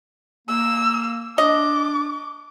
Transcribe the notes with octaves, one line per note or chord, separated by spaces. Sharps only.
A#3 E6
D4 D#5 D6